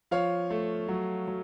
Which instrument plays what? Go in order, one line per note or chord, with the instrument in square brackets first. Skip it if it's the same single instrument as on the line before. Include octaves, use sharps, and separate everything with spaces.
[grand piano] F3 C#5 F5
A3
F#3
F#3